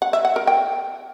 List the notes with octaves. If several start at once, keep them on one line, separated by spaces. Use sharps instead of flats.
F#5
E5
F#5
A#4
G5